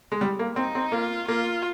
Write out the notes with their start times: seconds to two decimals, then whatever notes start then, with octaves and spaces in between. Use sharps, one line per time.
0.12 G#3
0.21 G3
0.39 A#3
0.56 C4 D#4
0.75 C4
0.92 A#3 F4
1.28 A#3 F4